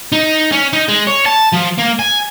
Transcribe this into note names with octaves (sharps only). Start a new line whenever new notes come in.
D#4
C#4
D#4
G#3
C#5
A5
F3
A#3
G#5